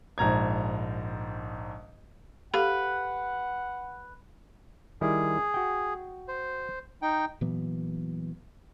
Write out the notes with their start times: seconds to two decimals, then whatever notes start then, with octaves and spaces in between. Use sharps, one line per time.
0.18 A#1 G#2 A#5 G#6
2.54 G4 A4 B4 F5 F#5
5.01 D#3 G3 E4 G#4
5.54 F#4 G5
6.28 C5
7.02 D#4 G5
7.41 A#2 E3 F#3 B3